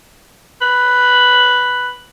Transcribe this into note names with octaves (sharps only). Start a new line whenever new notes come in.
B4